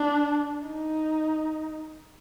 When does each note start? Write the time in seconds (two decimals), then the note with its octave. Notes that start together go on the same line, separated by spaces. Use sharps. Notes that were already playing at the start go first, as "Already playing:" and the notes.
Already playing: D4
0.66 D#4